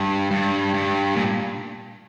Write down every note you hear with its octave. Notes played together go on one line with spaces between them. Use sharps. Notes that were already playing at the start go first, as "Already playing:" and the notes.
Already playing: G2
G2
G2
A#2